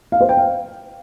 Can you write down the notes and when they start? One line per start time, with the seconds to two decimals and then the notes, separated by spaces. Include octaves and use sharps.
0.12 F5
0.21 C5
0.29 G5
0.37 F5